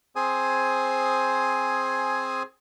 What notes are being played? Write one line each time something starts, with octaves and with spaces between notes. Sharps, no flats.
C4 G#4 C5 G#5 D#6